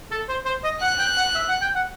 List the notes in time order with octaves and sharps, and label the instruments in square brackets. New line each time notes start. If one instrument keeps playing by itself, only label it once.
[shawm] A4
C5
C5
D#5
[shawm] F#5 [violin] F#6
[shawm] G5
F#5
E5
F#5
G5
F#5